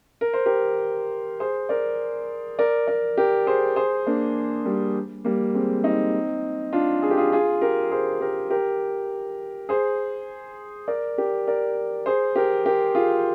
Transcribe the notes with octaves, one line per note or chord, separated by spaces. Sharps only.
A#4
C5
G4 A#4
G#4 C5
A#4 D5
A#4 D5
A#4 D5
G4 A#4
G#4 C5
G#4 C5
A#3 D4
G3 A#3
G3 A#3
G#3 C4
C4 D#4
D4 F4
G#4
G4
F4 G#4
F4 G#4
G4 A#4
G#4 C5
G4 A#4
G4 A#4
G#4 C5
A#4 D5
G4 A#4
A#4 D5
G#4 C5
G4 A#4
G4 A#4
F4 G#4